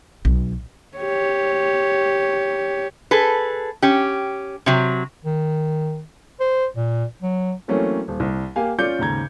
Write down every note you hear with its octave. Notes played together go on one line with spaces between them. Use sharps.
B1
G4 C#5
G#4 A4 B4
C#4 G4
C3 F#3
D#3
C5
A#2
F#3
E3 F#3 A3 A#3 C4 C#4
D#1
C2
A#3 G4 F5 G#5
C#4 F4 D5 D6 G6 C#7
D#2 G#2 C#3 A#5 G#6